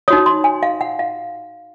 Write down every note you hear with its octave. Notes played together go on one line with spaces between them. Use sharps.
D#4 F#4 C#5 D#6
C6
G#5
F5
F#5
F5